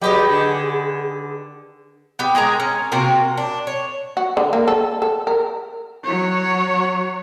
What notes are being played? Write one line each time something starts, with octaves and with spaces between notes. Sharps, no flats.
D#3 F#3 G4 G#4 B4 D#5 F#5
D3
B3 G4
G#3 G#4 A#4 A#5
C#4
C3 A#3 F#4 A#4
D4
C#5
F#4
D3
A#3
A4
A4
A#4
F#3 C#5